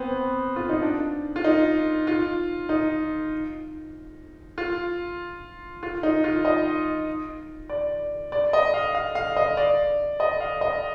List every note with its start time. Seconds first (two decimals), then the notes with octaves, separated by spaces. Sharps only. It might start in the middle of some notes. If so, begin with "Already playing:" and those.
Already playing: B3 C4
0.56 F4
0.69 D#4
0.82 D4
1.36 F4
1.44 D#4
2.07 F4
2.69 D#4
4.58 F4
5.83 F4
6.03 D#4
6.24 F4
6.45 D#5
7.70 D5
8.32 D5
8.53 D#5
8.74 F5
8.95 F5
9.15 F5
9.37 D#5
9.57 D5
10.20 D#5
10.40 F5
10.61 D#5